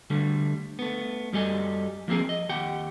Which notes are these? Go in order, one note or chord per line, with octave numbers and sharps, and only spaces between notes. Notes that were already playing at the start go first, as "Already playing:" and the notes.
D3 G3 A3
A3 B3
F#2 G3 G4 A4 D#5 G#5
F3 A#3 C4 G#4 A#4
D#5
D#2 G4 F#5 G5